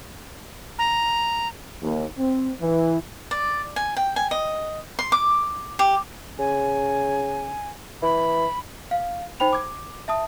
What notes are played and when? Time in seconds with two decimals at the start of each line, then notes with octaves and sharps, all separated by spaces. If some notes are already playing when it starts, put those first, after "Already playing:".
0.79 A#5
1.82 D#2
2.18 C4
2.61 E3
3.31 D5
3.76 G#5
3.96 G5
4.16 G#5
4.31 D#5
4.99 C6
5.12 D6
5.79 G4
6.39 C#3 G#5
8.02 E3 B5
8.91 F5
9.40 D#4 C5 G5 B5 F7
9.53 D6 G#6
10.08 E5 A5 D#6